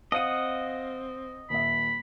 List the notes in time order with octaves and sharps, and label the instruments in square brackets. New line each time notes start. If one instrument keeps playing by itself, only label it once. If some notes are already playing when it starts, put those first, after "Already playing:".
[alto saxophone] C4 [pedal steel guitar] D#5 F#5 [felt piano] F5 D#6 D#7
[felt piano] D#1 E5 [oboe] B5